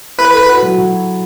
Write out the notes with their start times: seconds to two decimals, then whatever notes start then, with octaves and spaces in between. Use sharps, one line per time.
0.18 E4 B4
0.33 A4
0.49 F#4
0.63 F#3
0.78 F#3